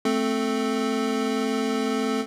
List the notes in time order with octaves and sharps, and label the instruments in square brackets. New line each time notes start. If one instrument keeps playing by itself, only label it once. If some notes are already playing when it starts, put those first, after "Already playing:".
[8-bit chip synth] A3 C4 A4